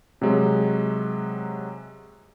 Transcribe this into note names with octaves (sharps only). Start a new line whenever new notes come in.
C3 F#3 G#3